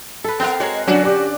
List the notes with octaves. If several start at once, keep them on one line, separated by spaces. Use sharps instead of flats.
A4 B4
B3 C4 A#4 F5 G5
G#3 F#4 A#4 C#5
D#5
D3 F#3 C#4 D4 F#4 D5
G4 D5